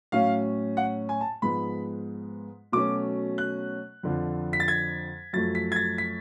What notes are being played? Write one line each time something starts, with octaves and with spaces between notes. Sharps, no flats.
A2 F#3 C#4 F5
F#5
G#5
A5
G#2 F3 G#3 B3 B5
B2 F#3 A3 C#4 D6
F#6
F2 D3 F3
B6
A6
G#6
F#2 F3 A3 A6
B6
G#6
A6
B6